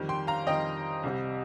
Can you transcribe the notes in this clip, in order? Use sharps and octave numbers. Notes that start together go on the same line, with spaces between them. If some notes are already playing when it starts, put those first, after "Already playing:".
Already playing: F2 D#3 G3
G5 C6
F5 A#5
F2 D#3 G3 D#5 G5
C2 C3 G3